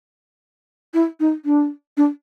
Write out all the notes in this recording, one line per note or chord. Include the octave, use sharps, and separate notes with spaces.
E4
D#4
D4
D4